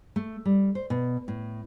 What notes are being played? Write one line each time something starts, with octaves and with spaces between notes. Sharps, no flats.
A3
G3
C5
B2
A2